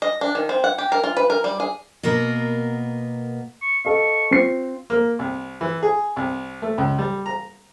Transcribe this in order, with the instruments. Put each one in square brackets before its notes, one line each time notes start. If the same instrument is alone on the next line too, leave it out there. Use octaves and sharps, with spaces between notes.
[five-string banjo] D#5
D4
D#3
C4
F#5
G4
A#4
F4
B4
A#4
G3
G#4
[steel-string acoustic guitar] B2 A#3 B3 A#4
[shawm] C#6
[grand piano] A4 D#5 F5 [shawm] C#6
[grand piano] C4 F4 C7
[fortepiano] A#3
C2
E3
G#4
C2
A3
C#2
G3
A#5